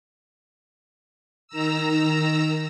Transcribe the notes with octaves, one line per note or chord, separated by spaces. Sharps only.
D#3 A#5 E6